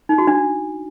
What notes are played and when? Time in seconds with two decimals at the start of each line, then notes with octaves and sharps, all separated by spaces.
0.09 D#4
0.18 F#4
0.27 D4